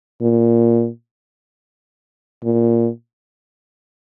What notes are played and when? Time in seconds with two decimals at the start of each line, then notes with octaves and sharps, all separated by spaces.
0.21 A#2
2.44 A#2